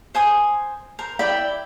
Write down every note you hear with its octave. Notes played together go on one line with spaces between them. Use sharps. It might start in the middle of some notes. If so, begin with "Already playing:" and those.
C5 G#5 D#6
A#4 C5
E4 D5 G5 B5